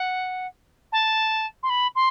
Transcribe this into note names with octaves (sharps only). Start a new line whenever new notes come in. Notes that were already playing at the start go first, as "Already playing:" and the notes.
Already playing: F#5
A5
C6
B5
C6